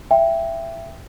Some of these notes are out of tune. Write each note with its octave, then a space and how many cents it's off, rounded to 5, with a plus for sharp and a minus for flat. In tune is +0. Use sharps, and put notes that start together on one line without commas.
E5 +15 G5 +5